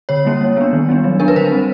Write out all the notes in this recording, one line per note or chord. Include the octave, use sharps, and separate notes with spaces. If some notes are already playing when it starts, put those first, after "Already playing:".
D3 C#5
G3 A#3 C#4
G3
B3 D4
D#3
G3 B3 D4
F#3
B3 D4 A#4
B4
D3 C5
G3 C4